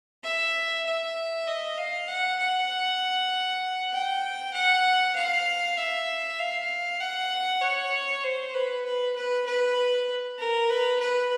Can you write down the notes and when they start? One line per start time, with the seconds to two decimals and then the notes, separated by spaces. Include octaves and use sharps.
0.23 E5
0.85 E5
1.47 D#5
1.77 F5
2.08 F#5
2.39 F#5
3.93 G5
4.54 F#5
5.15 F5
5.77 E5
6.39 F5
7.00 F#5
7.62 C#5
8.23 C5
8.54 B4
8.85 B4
9.16 B4
9.46 B4
10.38 A#4
10.70 B4
11.00 B4